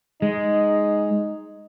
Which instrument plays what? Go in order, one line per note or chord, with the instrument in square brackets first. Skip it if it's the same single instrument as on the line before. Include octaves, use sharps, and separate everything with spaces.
[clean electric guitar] G#3 [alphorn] D#4